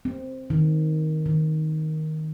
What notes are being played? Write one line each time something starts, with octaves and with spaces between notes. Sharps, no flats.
C4
D#3
D#3